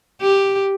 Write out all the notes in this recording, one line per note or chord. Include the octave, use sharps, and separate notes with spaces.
G4